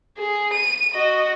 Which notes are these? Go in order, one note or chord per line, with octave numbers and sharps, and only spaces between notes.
G#4
D#7
F#4 D#5